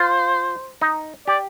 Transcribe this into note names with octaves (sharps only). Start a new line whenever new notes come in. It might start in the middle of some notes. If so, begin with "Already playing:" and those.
Already playing: F4 C5
D#4
G4 D5